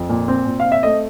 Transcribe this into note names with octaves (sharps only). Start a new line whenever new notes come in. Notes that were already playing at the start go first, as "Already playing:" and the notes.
Already playing: F2
A#2
C4
A#2
F5
C4
E5
A3 D#5